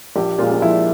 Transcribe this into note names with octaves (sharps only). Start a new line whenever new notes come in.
A#1 G4
A#2 F3 G#3 F4
F4
A#1 E4